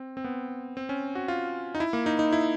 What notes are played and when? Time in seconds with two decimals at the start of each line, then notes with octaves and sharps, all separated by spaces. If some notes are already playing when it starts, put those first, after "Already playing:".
Already playing: C4
0.17 C4
0.24 B3
0.77 C4
0.89 C#4
1.15 F#4
1.28 F4
1.75 D#4
1.80 E4
1.93 A#3
2.06 D#4
2.19 D#4
2.33 E4